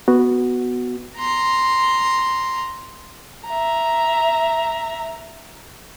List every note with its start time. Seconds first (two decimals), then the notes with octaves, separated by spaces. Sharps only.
0.08 B3 F#4
1.17 A#5 C6
3.46 E5 A#5